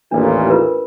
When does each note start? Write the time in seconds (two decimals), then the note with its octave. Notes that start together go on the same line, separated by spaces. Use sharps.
0.11 A1 D#2 A#2 D4
0.50 F4 A#4 B4